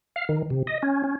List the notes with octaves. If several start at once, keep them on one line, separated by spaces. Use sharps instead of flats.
F5
D#3
C3
D#5
C#4
C#4